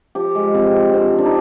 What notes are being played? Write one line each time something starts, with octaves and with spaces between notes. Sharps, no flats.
F3 G4
G#3
F3 C4
F3
D3 C4
D3
D4
D#4